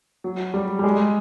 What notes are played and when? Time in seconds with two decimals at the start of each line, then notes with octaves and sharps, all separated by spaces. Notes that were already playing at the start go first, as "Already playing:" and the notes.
0.24 F#3
0.54 G3
0.79 G3
0.84 G#3